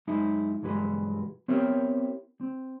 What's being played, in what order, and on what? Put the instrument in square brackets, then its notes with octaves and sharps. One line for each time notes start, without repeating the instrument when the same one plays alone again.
[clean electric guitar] F#2 G#3 D#4 E4
B1 G2 E3 G#3 F#4 B4
B3 C4 E4 G4 A#4 C#5
C4